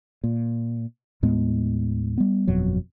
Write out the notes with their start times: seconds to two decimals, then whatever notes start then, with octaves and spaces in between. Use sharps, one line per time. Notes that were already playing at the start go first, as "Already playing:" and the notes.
0.24 A#2
1.23 D#2 A2 G#3 B3
2.18 G3 B3
2.47 G1 F2 B2 F#3